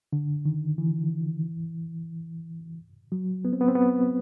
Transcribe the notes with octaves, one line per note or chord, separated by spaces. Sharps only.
D3
D#3
E3
F#3
B3
C4
B3
C4
B3